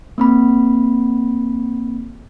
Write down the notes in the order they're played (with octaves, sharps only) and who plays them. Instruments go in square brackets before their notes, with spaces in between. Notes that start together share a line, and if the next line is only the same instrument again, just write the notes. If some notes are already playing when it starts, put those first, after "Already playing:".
[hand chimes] A#3 C4 B5